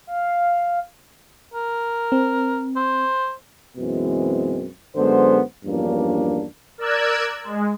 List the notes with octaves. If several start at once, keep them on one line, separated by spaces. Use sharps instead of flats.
F5
A#4
C4
C5
F#2 B2 E3 G#3 C4
F#2 D3 G#3 B3 C5
E2 G2 F3 A#3 C#4 D4
A#4 D5 E6 F#6 G#6
G#3